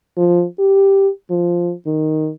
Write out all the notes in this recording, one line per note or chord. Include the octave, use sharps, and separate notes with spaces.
F3
G4
F3
D#3